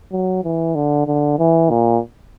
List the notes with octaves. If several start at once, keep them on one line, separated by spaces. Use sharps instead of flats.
F#3
E3
D3
D3
E3
A#2